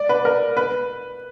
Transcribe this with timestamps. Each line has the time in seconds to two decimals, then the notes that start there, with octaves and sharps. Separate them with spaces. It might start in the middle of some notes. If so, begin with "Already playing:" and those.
Already playing: D5
0.09 B4
0.25 A#4
0.57 B4